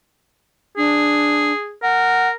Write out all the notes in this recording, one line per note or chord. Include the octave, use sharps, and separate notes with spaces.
D4 G#4
A#4 F#5